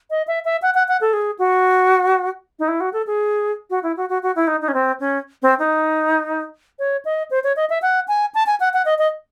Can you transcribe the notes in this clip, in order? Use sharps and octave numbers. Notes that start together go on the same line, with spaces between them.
D#5
E5
E5
F#5
F#5
F#5
A4
G#4
F#4
D#4
E4
F#4
A4
G#4
F#4
E4
F#4
F#4
F#4
E4
D#4
D#4
C#4
C4
C#4
C4
D#4
C#5
D#5
C5
C#5
D#5
E5
F#5
G#5
A5
G#5
F#5
F#5
D#5
D#5